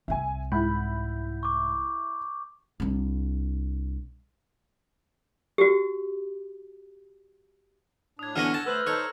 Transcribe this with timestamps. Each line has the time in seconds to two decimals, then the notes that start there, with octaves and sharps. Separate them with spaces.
0.08 C2 C3 E5 G#5
0.52 G#2 E4 F#5 B5 G6
1.43 C#6 D6
2.80 C2 D4
5.58 F#4 G4
8.19 A2 D4 D#6 G#6
8.36 D3 E3 B3 C#4 F6 A#6
8.54 A4 F#5 A5
8.66 A3 B4 C5 E6 F#6 F#7
8.87 D#4 A4 C5 C#5